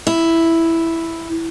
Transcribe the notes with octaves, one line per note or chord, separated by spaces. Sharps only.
E4